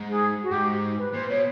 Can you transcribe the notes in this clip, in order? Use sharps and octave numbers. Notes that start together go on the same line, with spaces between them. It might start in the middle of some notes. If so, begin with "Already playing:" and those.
Already playing: G#2
G#4
F#4
G#2 G4
B4
A#2 C5
B2 C#5